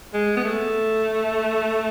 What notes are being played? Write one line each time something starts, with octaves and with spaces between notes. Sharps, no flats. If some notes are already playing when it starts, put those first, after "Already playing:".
G#3
B3
A3